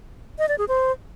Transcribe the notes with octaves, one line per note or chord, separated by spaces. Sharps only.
D#5
D5
G#4
C5